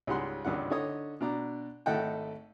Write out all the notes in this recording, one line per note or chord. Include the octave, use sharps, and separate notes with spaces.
C#2 G#2 G3 F#5 C6
G#1 C#2 G2 D#3 F#5
D3 D#4 C#5 D#6
B2 D4 A#5
G#1 A3 A4 D#5 F#5 G5